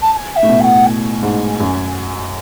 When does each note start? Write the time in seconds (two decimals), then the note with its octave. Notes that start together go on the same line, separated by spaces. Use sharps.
0.02 A5
0.12 A5
0.16 G#5
0.36 E5
0.43 A2
0.49 B2
0.61 G#5
0.64 F#5
0.86 G#5
1.22 G#2
1.60 F#2